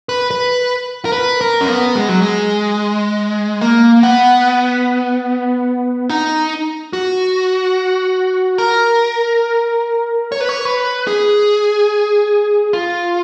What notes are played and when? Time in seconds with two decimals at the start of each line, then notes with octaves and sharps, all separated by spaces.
0.09 B4
0.31 B4
1.05 A#4
1.12 B4
1.41 A#4
1.61 C#4
1.68 B3
1.95 G#3
2.09 F#3
2.22 G#3
3.61 A#3
4.03 B3
6.09 D#4
6.93 F#4
8.58 A#4
10.32 C#5
10.41 B4
10.49 C#5
10.65 B4
11.07 G#4
12.73 F4